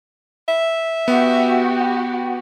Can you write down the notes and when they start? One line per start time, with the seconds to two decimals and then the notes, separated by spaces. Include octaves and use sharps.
0.48 E5
1.08 B3 F#4 G4